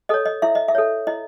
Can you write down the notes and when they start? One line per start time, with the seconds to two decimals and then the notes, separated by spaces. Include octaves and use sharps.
0.09 A4 C#5 D#5
0.26 D#5
0.42 E4 E5
0.55 D#5
0.68 E5
0.75 A4 C#5
1.07 E4 D#5